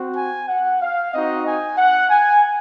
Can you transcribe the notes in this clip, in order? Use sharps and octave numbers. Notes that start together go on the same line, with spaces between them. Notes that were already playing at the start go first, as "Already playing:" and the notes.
Already playing: C4 F#4
G#5
F#5
F5
C4 D#4 F#4 D#5
G#5
F#5
G#5